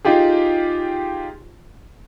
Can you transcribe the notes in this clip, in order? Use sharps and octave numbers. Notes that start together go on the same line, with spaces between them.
D#4 F4 G4 G#4